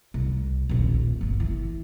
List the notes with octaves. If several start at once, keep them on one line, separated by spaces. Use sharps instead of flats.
C2
D#1 A#1
G1 A#3
E3